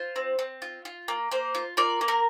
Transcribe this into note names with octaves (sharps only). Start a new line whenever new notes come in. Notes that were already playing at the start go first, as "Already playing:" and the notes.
Already playing: F4 C5
C4
C4
F4
F4
A#3
A#3 C5
F4
F4 A#4 D5
A#3
A#4